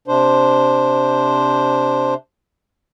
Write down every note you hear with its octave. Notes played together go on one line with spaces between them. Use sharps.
C3 D4 C5